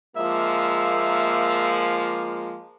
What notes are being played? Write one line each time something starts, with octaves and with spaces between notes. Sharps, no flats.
F3 G#3 A#3 E5